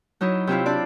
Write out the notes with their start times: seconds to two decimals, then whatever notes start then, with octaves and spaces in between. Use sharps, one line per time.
0.21 F#3 D#4 E4
0.47 C3 C4 E4 F4
0.66 C4 D4 D5